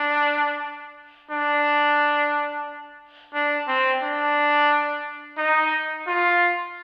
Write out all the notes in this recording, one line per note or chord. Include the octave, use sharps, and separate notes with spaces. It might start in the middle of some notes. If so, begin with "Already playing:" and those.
Already playing: D4
D4
D4
C4
D4
D#4
F4